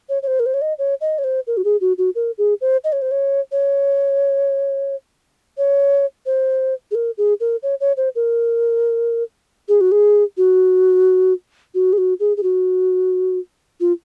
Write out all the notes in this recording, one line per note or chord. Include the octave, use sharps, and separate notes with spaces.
C#5
C#5
C5
A#4
C5
C#5
D#5
C#5
D#5
C#5
C5
A#4
F#4
G#4
F#4
F#4
A#4
G#4
C5
D#5
C#5
C5
C#5
C#5
C#5
C5
G#4
A#4
G#4
A#4
C#5
C#5
C5
A#4
G#4
F#4
G#4
F#4
F#4
G#4
F#4
G#4
G#4
F#4
F4